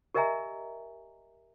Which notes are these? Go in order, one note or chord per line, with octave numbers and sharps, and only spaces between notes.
G4 A#4 D#5 E5 G#5 A#5